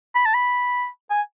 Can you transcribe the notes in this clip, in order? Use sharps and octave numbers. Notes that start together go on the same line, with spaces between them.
B5
A5
B5
G#5